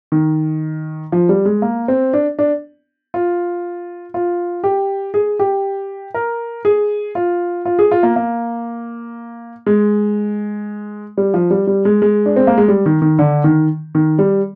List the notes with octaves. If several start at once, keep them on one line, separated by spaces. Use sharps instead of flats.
D#3
F3
G3
G#3
A#3
C4
D4
D4
F4
F4
G4
G#4
G4
A#4
G#4
F4
F4
G#4
F4
A#3
A#3
G#3
G3
F3
G3
G3
G#3
G#3
D4
C4
A#3
G#3
G3
D#3
D#3
D3
D#3
D#3
G3